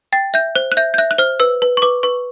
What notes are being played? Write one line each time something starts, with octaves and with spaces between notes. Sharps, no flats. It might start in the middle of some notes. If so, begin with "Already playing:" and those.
G5 A6
E5 G6
C5 F#6
F#6
E5 G6
G6
E5 F#6
F#6
C5 F6
B4 E6
B4
C#6
B4 D6
B4 C#6